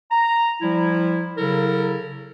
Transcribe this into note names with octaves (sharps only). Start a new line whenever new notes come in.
A#5
F3 G3 E4
C#3 F#3 E4 A4 A#4